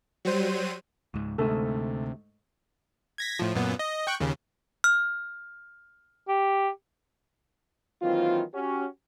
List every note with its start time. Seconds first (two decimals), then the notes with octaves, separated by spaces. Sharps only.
0.25 F#3 G3 C5 D#7
1.14 C#2 G#2
1.38 D2 G#2 C3 A3 A4
3.18 G#6 A#6 B6
3.39 A2 F3
3.55 F#2 A#2 B3
3.79 D#5
4.07 G5 C#6 F#6
4.20 D#2 C#3
4.84 F6
6.28 G4
8.02 D#3 E3 F#3 A#3 C4 F4
8.54 C#4 F#4 G4